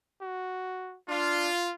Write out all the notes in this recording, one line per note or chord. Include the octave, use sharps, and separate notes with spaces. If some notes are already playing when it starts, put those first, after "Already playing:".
F#4
D4 F4